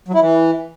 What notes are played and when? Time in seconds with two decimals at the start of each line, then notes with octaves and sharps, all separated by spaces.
0.08 F#3
0.14 E4
0.20 E3